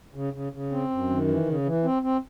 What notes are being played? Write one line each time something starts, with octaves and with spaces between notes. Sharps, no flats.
C#3
C#3
C#3
C4
F#2
D#3
E3
C#3
E3
C4
C4